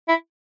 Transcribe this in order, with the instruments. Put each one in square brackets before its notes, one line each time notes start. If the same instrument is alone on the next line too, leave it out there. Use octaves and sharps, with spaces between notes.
[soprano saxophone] E4